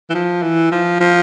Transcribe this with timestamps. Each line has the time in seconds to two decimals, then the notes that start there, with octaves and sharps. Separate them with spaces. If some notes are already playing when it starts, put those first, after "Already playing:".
0.10 E3
0.14 F3
0.42 E3
0.72 F3
1.00 F3